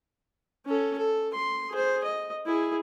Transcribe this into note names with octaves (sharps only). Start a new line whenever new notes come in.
C#4 A4
A4
C6
G#4 C5
D#5
E4 G#4